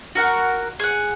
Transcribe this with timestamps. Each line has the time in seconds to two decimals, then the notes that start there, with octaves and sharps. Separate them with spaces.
0.15 F#4 A#4 F#5
0.80 G#4 F#5